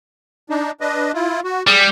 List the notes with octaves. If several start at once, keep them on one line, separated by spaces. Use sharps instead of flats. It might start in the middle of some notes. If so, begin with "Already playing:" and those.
D4 D#4
D4 B4 D#5
E4 F4
F#4
G3 G#4 D6 D#6